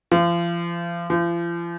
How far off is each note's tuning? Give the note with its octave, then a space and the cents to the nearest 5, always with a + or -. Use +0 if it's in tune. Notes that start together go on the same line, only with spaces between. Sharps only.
F3 -35
F3 -40